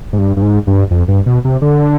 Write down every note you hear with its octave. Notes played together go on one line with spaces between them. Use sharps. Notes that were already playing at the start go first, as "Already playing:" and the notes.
G#2
G2
G2
G#2
G2
F2
G2
B2
C3
D3